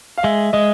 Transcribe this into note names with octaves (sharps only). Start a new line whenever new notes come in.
F5
G#3 E5
G#3 D#5